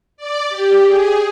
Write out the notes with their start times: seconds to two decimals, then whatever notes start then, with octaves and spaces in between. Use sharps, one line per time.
0.17 D5
0.49 G4
0.86 G#4